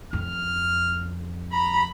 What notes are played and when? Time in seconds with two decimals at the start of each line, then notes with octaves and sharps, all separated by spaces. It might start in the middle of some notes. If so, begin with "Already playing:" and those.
0.13 F2 F6
1.52 A#5 B5